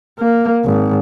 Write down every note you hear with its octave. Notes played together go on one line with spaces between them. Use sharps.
A#3
G#1